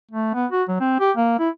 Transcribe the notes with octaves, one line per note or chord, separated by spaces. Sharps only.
A3
B3
F#4
F#3
C4
G4
A#3
E4